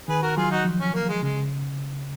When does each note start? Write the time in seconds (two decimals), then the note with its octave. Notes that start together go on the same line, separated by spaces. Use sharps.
0.08 D#3 G#4 B4
0.22 F#4 A#4
0.36 F#3 F4 G#4
0.51 D#4 F#4
0.65 F3
0.80 C#4
0.94 A#3
1.09 G#3
1.23 C#3 G#3